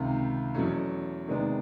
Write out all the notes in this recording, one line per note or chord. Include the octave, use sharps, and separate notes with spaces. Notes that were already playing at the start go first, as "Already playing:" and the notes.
Already playing: C#2 C3 D#3
E2 B2 F#3 A3 C#4
C3 D#3 G#3 B3 D4